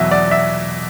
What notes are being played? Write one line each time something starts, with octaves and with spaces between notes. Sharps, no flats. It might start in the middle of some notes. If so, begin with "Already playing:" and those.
Already playing: E2 B2 F#3 E5
D5
E5